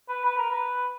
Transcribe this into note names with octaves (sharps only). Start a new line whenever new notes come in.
B4
B4
A#4
B4